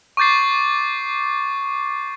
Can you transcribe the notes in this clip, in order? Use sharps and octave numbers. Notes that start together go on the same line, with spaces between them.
C#6 D6 G6 A6 C7